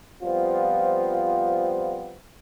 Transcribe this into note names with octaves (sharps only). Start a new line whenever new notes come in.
F3 G3 B3 C4 F4